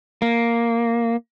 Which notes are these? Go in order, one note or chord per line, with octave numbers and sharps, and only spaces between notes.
A#3